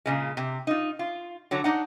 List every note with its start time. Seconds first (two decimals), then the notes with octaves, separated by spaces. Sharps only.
0.06 A#2 C#3 G#3
0.37 C3
0.67 D#4 F4
0.99 F4
1.51 D3 F#3 C#5
1.64 D4 D#4 F#5